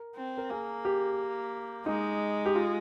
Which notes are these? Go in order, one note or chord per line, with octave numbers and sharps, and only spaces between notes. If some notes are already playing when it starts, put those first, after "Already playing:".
Already playing: A#4
C4
A#4
A#3 G#4
G4
G#3 D#4
G4
F4